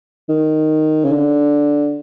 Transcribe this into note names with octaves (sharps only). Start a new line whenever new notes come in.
D#3
C#3
D3